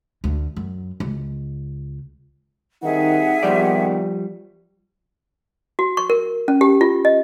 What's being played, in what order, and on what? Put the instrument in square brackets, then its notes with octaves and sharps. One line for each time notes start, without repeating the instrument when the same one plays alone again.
[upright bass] D2
F#2
C#2
[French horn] D#3 [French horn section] G3 C4 D#4 [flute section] G#4 E5 F#5
[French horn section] A#2 D#3 B3 [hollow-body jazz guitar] F3 G3 D5 [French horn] G4
[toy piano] F#4
C#6
A#4
C#4
G4
F4
D#5